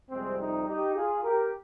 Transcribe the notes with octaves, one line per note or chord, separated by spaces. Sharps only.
F2 C3 G3 G#3 C4
C4 D#4
D#4 G4
F4 G#4
G4 A#4